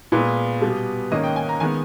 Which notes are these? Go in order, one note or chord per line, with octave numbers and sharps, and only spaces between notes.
A#2 G#3 B3 B4
B2 G3 B3
G#2 D#3 A#3 C#4 D#5
G5
G#5
A#5
D#3 G#3 B3 G#5